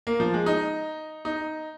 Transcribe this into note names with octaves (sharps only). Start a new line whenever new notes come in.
A#3
F3
G#3
D#4
D#4